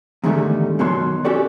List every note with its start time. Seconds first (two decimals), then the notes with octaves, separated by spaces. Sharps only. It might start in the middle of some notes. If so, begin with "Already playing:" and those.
0.24 E2 G#2 D3 D#3 G3 A3
0.79 F#2 B2 D#3 F#3 C6
1.25 C#4 F#4 G4 A4 D5